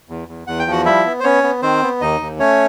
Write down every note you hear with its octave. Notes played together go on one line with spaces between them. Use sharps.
E2
E2
E2 F#5
G5
F3 F#4 F#5
G3 E4 E5
B3
C5
B3 C#4 C#5
B3
D#3 C4 C5
B3
D#2 D#4 D#5
D#2
A3 C#4 C#5